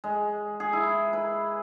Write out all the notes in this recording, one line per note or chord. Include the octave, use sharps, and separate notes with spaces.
G#3
G#4
E4
B4